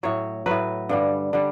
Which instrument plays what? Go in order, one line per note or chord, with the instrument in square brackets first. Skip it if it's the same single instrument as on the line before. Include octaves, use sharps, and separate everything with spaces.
[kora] A2 F#3 C#5
A2 F#3 B4
G2 D3 G3
D3 G3